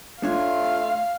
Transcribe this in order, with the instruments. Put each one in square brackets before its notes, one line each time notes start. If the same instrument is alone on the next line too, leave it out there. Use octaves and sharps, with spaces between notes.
[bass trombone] A3 [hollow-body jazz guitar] D4 C#5 [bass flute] F4 [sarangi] F5